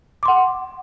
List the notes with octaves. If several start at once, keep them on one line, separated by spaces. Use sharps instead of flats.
F#5 C6 D6